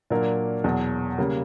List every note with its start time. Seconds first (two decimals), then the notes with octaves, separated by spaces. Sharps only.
0.10 A#2 F#3 A#3 D4 A#4
0.64 E2 B2 F#3
1.18 C#3 G3 A#3